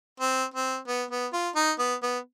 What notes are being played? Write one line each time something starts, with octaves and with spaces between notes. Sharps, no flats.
C4
C4
B3
B3
F4
D#4
B3
B3